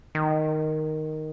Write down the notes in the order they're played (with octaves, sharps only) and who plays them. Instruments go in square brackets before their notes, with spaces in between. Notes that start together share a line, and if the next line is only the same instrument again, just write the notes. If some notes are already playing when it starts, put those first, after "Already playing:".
[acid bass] D#3